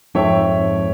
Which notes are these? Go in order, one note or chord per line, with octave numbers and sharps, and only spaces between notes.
F2 G#2 C#5 E5 G5